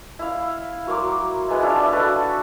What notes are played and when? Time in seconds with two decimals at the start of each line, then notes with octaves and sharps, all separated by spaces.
0.19 E4 F5
0.87 F#3 A#4 C6 D6
1.48 G#3 B3 E4
1.62 D4 E4 F4 C#5
1.92 F#4 A4 B4 F#5